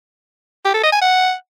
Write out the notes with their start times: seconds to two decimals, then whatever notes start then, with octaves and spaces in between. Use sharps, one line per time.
0.65 G4
0.74 A4
0.83 D#5
0.92 G#5
1.02 F#5